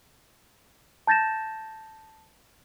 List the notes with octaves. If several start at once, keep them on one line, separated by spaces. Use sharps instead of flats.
A5 G6 A6 A#6 E7